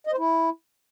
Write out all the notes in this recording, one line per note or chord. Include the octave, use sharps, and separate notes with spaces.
D#5
C5
E4